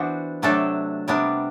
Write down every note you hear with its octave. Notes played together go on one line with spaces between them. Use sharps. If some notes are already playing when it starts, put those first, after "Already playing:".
Already playing: E3 B3 D4 F#4 C5
C3 F#3 A3 D4 A4
C3 G3 B3 D4